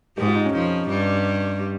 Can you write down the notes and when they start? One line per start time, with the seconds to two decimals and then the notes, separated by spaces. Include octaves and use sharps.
0.18 G#2 G#3 G4
0.27 F4
0.35 D#4
0.45 C#4
0.53 F2 F3 D#4
0.88 G2 G3